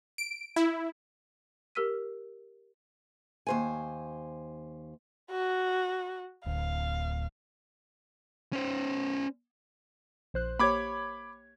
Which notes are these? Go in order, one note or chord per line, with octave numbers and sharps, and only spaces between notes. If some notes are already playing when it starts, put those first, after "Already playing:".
D7
E4
G4 A#4 E6 F6 B6 D#7
D#2 C5 G#5
F#4
D1 F5
C#4 C5
A#1 C5 F#6
A#3 G4 C#5 B5 D6 G#6